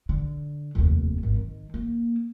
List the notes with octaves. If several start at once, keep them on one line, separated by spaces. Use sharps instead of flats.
D3
F1 D#2
G#1
D#3
A#3